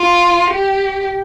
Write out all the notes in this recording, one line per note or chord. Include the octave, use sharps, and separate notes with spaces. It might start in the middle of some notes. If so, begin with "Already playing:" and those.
Already playing: F4
G4